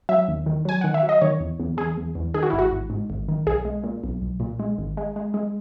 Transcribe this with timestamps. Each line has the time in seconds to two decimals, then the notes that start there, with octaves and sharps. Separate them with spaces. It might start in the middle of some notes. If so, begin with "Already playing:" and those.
0.09 F#3 E5
0.28 D#2
0.46 D#3
0.65 F#3 G#5
0.81 D#3 F#5
0.94 E5
1.03 F#3
1.09 D#5
1.21 D#3 C#5
1.40 E2
1.60 E2
1.77 E2 G#4
1.97 E2
2.15 E2
2.34 D#3 G#4
2.43 F#4
2.50 G#1 E4
2.59 F#4
2.72 G#1
2.90 G#2
3.10 G#1
3.29 D#3
3.47 B1 G#4
3.65 G#3
3.84 A#2
4.04 B1
4.22 B1
4.40 A#2
4.60 G#3
4.78 G#1
4.97 G#3
5.16 G#3
5.34 G#3